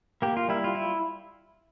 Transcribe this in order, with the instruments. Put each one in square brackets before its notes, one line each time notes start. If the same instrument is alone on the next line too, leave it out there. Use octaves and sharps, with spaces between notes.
[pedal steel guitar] A#3 G4
F4
G3 E4
F4
E4